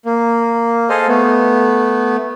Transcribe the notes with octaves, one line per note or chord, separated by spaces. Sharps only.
A#3
G#4 A4 C5 D#5 F5
A3 B3